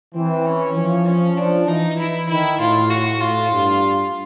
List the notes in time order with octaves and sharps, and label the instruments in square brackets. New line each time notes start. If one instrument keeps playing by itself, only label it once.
[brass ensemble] E3 [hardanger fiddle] C4
[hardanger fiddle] C#4
[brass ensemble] F3
[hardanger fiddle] C#4
[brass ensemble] F3 [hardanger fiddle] D4
[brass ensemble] E3 [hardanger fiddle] D#4
[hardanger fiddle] E4
[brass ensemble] D#3 [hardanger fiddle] E4
[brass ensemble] A2 [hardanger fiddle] F4
[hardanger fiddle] F#4
[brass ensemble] A2 [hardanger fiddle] F4
[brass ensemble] G2